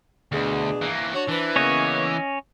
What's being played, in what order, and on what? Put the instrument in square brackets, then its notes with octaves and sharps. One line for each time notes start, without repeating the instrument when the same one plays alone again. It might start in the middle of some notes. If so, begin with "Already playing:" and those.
[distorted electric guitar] D2 [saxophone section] B2 D4 G#4
[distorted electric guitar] E3 A#3
[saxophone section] D4 C#5 [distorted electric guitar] F#4
[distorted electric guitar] E3 [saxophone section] D4 B4 C5
[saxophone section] C#3 A#3 B3 [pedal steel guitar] C#4 C#5 D#5